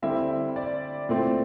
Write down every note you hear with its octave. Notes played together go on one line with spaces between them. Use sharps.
D3 G3 C4 E4 E5
D5
A#2 A3 C4 E4